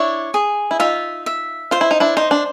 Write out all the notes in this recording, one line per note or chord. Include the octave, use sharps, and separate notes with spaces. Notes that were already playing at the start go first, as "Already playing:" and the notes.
Already playing: D4 E4 C#5
G#4
E4
D#4 F4 E5
E5
F4 C5
E4
D#4
D4 E4
D#4 C5
D4